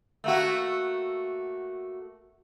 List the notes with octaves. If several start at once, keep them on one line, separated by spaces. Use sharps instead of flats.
A3 A#3 F#4